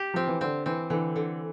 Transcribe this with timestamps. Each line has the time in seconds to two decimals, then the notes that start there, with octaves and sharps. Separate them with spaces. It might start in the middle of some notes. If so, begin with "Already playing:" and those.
Already playing: G4
0.14 F3 C4
0.27 E3
0.41 D3 C4
0.66 E3 C4
0.90 D3 E3
1.16 D3